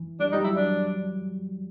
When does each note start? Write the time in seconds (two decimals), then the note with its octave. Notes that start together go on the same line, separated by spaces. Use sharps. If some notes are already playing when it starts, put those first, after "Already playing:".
Already playing: E3
0.20 G3 D4
0.32 G3 D#4
0.44 F#3 E4
0.56 D4